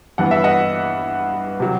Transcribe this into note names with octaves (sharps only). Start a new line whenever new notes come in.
G2 E3 B3 F#5
E5
D#5 F#5
C3 F#3